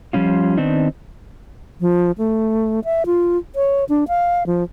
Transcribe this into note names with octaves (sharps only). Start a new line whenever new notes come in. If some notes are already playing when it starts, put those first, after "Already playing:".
F3 G3 C#4 F4
D#3 B3 C4 D4 D#4
F3
A3
E5
F4
C#5
D4
F5
F3